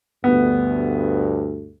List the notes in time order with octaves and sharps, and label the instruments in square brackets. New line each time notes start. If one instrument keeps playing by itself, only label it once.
[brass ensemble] D2 G2 [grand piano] B3